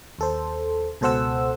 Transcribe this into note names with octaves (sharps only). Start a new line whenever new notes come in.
D#2 A4 C5
C#2 B2 A4 C5 F#5 E6